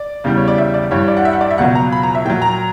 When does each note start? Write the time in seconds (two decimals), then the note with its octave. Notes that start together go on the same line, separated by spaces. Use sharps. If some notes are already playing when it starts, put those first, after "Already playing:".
Already playing: D5
0.24 E2 C#3 G3
0.37 C#5
0.48 D5
0.58 E5
0.74 D5
0.91 G2 E3 G3 C#5
1.08 D5
1.17 F#5
1.25 E5
1.33 F#5
1.41 D5
1.50 E5
1.58 C#2 B2 F#3 F#5
1.75 A#5
1.92 B5
2.03 A#5
2.15 E5
2.25 A#2 F#3 G5
2.42 A#5